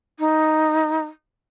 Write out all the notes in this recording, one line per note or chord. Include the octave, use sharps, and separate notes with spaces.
D#4